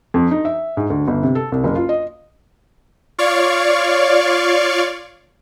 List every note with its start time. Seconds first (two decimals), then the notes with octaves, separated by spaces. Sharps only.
0.14 F2
0.31 D#4
0.45 E5
0.77 G#2
0.90 D2
1.08 G1
1.23 C3
1.35 A4
1.52 C2
1.64 F#1
1.75 F4
1.89 D#5
3.18 F4 C#5 D5 F5 C#6